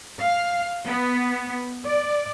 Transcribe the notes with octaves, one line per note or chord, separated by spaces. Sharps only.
F5
B3
D5